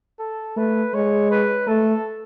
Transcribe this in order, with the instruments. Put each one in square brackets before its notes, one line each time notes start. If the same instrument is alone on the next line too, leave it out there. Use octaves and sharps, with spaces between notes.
[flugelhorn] A4
[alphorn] A3 [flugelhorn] B4
[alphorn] G#3 [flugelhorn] C#5
[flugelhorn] B4
[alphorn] A3 [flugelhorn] A4